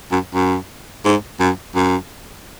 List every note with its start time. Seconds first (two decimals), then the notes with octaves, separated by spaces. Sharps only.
0.11 F#2
0.34 F#2
1.05 G#2
1.39 F#2
1.75 F#2